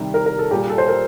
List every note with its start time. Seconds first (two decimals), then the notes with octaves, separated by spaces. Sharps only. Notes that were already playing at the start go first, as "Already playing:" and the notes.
Already playing: C3 D#3 G3
0.14 A#4
0.26 A#4
0.39 A4
0.51 A#2 G3 G4
0.70 A4
0.78 C5
0.88 A#4